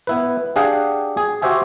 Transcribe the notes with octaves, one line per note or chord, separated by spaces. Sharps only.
B3 E4 B4
D4 G4 G#4 F5 F#5
G#4
F#4 G4 C5 E5 G#5